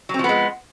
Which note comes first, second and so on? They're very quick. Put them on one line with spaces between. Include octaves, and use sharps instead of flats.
F#3 C4 F3 B3 G#3